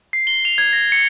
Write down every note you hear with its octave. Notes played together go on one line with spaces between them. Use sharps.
C7
G7
F7
G#6
A#6
C#7